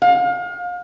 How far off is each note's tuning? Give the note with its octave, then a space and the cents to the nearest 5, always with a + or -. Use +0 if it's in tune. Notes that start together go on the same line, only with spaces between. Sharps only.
F5 +35